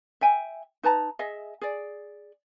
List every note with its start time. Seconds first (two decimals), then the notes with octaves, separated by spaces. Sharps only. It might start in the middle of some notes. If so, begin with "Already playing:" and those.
0.21 E5 G5 G#5
0.83 D#4 B4 A5 A#5
1.19 G#4 D#5 E5
1.61 G#4 D5